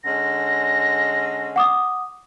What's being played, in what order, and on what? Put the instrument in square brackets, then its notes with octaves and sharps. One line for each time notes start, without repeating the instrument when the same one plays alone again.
[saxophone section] D3 G#3 C#4 [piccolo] A#6
[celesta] F#5 D6 D#6